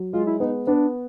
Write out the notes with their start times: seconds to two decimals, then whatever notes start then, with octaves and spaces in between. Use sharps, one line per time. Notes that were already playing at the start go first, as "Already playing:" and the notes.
Already playing: F#3
0.13 G#3 F4
0.27 E4
0.40 B3 D#4
0.67 B3 D4